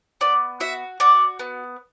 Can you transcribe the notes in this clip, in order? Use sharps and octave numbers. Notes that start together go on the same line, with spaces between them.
B3 D5
F#4 E5
F#4 D5
B3